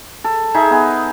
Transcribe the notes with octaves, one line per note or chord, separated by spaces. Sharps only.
A4
D#4 G#4 E5
B3 G#5